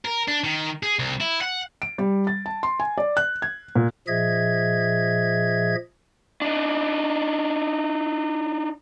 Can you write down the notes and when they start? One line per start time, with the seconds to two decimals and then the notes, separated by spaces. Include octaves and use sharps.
0.05 A#4
0.28 D4
0.44 D#3
0.83 G#4
0.99 C2
1.21 E4
1.41 F#5
1.82 D7
1.98 G3
2.27 A6
2.46 A5
2.63 C6
2.80 G#5
2.98 D5
3.17 F#6
3.42 G#6
3.76 A#2
4.08 A#2 F3 G#4 D#5 E5 G#6
6.42 D4 D#4